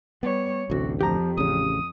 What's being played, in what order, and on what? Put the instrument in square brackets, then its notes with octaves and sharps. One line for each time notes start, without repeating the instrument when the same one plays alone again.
[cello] G3 C#5 [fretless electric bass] B3
[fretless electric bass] A1 D2 [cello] C3 [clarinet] F#4
[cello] F2 [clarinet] F3 [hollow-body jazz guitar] G4 A#5
[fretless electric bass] A1 C#3 [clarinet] D#6